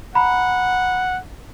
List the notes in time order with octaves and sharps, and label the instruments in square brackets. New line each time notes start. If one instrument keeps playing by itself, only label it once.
[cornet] F#5 [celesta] A#5 B5